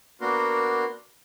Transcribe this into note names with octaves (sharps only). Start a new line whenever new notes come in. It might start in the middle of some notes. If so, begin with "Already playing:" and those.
A#3 B3 D4 F#4 A#4 C6